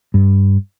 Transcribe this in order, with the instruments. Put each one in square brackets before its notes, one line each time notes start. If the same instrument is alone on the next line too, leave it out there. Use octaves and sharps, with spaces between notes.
[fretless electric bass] G2